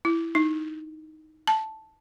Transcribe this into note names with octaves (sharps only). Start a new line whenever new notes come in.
E4
D#4
A5